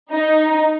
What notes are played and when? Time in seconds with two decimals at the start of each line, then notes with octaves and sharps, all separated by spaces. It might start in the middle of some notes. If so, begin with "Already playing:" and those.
0.11 D#4